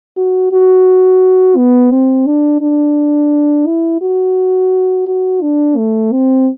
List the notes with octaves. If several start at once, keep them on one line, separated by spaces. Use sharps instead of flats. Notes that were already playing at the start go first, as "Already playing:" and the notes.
F#4
F#4
B3
C4
D4
D4
E4
F#4
F#4
D4
A3
C4